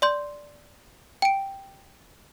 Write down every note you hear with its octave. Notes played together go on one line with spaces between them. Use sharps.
D5 C6 G6
G5 D7